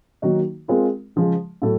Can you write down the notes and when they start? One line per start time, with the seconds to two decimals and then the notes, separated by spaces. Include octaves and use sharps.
0.22 D#3 F#3 A#3 D#4 F#4
0.68 G#3 C4 F4 A#4
1.16 C#3 F3 G#3
1.62 A2 F#3 A3